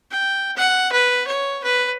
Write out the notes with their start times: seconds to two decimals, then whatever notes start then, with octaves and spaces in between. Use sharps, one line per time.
0.11 G5
0.56 F#5
0.92 B4
1.27 C#5
1.63 B4